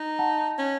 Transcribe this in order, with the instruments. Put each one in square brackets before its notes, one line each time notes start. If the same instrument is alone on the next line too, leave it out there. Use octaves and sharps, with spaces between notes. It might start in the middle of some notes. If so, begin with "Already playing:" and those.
Already playing: [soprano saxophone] D#4
[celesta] F#5 A5
[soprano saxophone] C#4